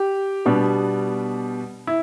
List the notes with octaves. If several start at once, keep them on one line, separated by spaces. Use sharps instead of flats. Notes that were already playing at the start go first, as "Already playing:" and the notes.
Already playing: G4
B2 G3 B3 D4
E4